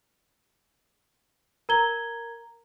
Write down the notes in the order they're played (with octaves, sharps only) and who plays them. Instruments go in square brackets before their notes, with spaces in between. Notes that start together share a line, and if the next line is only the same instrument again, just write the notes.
[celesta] A#4 A#5 G#6 G7